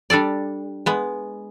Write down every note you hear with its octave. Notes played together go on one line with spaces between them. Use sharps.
G3 D4 A4 D5
G#3 B3